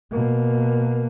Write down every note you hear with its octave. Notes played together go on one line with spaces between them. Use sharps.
B2 A#3